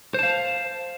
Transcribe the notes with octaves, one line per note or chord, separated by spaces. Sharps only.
C5 F5 A5